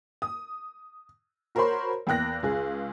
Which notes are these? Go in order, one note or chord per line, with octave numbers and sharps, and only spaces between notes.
D#6
F#4 A#4 C5 C#5 B5 C6
E2 A#3 G5 F#6 A#6
C#2 G#4